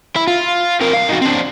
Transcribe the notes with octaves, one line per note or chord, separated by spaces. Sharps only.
E4
F4
C4 A#4
B1 F5
D#4 F#4
C4 D4